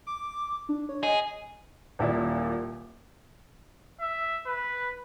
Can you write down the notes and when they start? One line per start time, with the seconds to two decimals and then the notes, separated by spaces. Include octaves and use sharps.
0.07 D6
0.69 D4
0.89 C#5
1.03 G#4 D#5
1.99 D#1 A#2 E4 D5
4.01 E5
4.46 B4